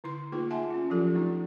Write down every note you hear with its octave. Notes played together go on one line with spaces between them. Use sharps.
D3 E4 C6
A3 A#3 D#4 F4 G#4 B4
E5 F#5 G#5 A5 C6
C#4 F4
F3 F#3 E4 F4 G4 A4
A3 D4 D#4